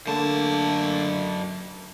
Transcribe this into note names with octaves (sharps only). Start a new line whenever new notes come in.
F#2 D3 A3 A#3 A5